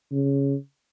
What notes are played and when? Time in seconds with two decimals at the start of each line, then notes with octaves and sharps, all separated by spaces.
0.12 C#3